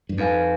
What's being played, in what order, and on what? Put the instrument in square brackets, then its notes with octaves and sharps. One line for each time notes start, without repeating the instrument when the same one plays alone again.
[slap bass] G2
[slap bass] F2 [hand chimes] D#4 B4 F5 G#5